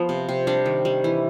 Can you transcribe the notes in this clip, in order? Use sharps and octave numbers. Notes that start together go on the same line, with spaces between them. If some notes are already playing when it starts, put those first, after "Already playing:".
Already playing: F3 B3
C3
C3
G3 D4
D#3
G3
E3